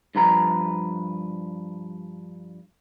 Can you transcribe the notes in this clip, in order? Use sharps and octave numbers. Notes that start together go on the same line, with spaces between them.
G2 F3 B4 A#5